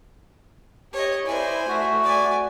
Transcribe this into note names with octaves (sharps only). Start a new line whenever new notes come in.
G4 C#5 D#5
E4 C5 D5 G#5
A3 F#4 E5
D5 G#5